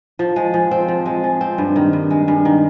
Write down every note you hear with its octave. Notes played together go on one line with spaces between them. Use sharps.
F3
G#3
F3
C4
F3
G#3
F3
C4
G2
D#3
G2
G#3
G2
D#3